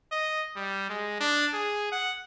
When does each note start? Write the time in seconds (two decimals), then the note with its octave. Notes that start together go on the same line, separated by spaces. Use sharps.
0.12 D#5
0.56 G3
0.89 G#3
1.21 D4
1.54 G#4
1.92 F#5